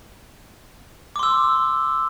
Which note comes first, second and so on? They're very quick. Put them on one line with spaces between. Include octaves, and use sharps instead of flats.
D6 C6 E6